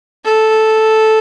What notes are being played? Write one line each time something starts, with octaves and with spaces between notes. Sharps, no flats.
A4